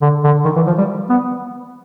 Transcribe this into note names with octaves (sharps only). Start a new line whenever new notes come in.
D3
D3
D#3
E3
F3
G3
B3